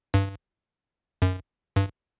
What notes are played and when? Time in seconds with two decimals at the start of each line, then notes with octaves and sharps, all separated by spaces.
0.14 G2
1.22 F#2
1.76 G2